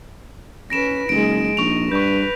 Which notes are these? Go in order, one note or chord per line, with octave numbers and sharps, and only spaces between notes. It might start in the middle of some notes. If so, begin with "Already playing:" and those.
C#4 B4 A#6 D7 E7
F#1 G#3 D#4 D7
A#1 D#4 C#6 F7
G2 B4 C#6 G6